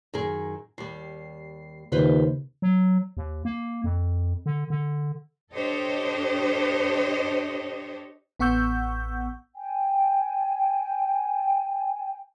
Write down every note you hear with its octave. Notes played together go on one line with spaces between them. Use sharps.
F#2 D#3 G#4
D#2 G3 C7
D#2 C#3 F4 B4 C5
F#3
D#2
A#3
F2
D3
D3
D4 G4 A4 C5 C#5 D#5
A1 B3 F#5 C#6 E6 G6
G5 G#5